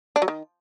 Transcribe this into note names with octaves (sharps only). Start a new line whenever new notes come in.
D4
F#3
D#3